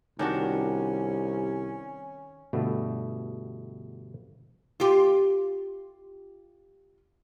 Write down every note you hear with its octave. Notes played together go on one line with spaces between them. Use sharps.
C2 D#3 C#4 D4 F#4
G1 B2 A3 D4
F4 G4